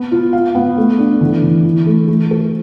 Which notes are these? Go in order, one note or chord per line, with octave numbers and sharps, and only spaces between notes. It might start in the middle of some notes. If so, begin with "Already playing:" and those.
Already playing: B3
F4
F5
B3
A3
D4
E3
E3
E4
A3
A3
A4